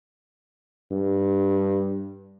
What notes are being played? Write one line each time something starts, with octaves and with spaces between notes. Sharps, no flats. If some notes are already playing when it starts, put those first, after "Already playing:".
G2